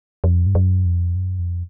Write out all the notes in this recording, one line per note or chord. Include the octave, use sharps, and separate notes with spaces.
F2
G2
F#2
F2
F#2
F2